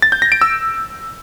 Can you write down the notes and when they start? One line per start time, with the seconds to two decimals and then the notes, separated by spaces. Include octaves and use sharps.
0.02 A6
0.12 G6
0.22 A#6
0.32 D7
0.41 E6